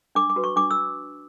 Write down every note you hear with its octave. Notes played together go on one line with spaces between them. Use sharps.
D4 D6
D6
F#4 B4
C#6
D4 D6
E6